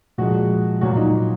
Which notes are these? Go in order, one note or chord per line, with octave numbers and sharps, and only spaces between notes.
A#2 F3 G#3 F#4
A#2 F#3 F#4
D#4